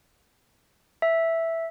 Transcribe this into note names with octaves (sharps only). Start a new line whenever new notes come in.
E5